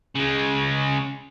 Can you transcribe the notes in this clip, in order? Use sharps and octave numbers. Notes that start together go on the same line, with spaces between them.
C#3 G#3